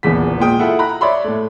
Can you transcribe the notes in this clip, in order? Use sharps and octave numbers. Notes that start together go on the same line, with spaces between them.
D#1 A#1 E2 C#3 B6
A#2 G#3 G5 D#6
E4 F4 A4 E5 F#5
A#5 B5 F#6
C#5 D5 E5 B5 C6
A2 A3